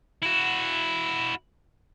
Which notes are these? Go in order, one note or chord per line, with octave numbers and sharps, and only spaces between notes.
E4 F#4